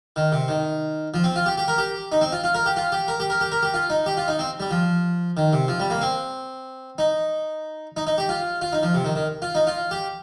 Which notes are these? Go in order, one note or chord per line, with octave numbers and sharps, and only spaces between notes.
D#3
C3
D#3
F3
C4
F4
G4
G4
A#4
G4
D#4
C4
F4
F4
A#4
G4
F4
G4
A#4
G4
A#4
G4
A#4
G4
F4
D#4
G4
F4
D#4
C4
G3
F3
D#3
C3
F3
G3
A#3
C4
D#4
D#4
D#4
G4
F4
F4
D#4
F3
C3
D#3
D#3
F4
D#4
F4
G4